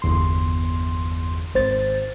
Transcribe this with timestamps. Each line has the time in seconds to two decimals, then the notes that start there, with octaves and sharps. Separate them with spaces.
0.02 G1 E2 C6
1.54 G#1 C5 A6